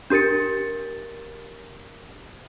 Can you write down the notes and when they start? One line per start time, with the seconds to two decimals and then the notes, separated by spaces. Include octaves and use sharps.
0.10 D4 G4 A#4 A6 C#7